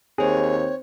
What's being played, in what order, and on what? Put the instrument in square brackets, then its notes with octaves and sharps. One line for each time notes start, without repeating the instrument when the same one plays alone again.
[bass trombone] D#2 [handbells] C4 C5 [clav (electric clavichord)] G#4 [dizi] C#5